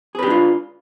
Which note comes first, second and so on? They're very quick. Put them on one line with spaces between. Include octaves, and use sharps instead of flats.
G#4 B4 G4 D4 F4